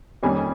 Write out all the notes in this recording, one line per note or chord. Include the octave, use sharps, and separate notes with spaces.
F2 D#3 G3 A#3 C#4 G#5